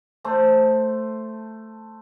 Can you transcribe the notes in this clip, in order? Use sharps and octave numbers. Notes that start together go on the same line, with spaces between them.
A3 C5